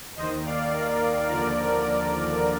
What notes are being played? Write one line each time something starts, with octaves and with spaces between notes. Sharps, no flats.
D#2 D#3 C5 D#5
D5 F5
A#4 D5
D#2 D3 F3 A#4 D5